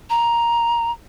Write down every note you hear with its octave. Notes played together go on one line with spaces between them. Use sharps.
A#5